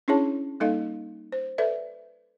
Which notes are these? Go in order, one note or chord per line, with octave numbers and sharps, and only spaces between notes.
C#4 D4 E4 G#4 C#5 A5
G3 A#3 D#4 A4 D#5 F5
C5
A4 B4 D5 E5